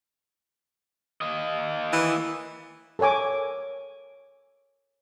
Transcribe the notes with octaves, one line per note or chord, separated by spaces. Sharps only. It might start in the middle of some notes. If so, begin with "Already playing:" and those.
A#3 D#5
E3
A4 A#4 C#5 G#5 D6